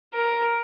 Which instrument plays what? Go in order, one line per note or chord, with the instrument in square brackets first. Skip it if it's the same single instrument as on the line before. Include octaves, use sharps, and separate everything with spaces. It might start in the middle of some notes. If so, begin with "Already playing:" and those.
[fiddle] A#4